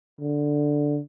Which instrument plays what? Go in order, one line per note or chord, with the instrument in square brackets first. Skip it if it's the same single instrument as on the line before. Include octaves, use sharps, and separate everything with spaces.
[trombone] D3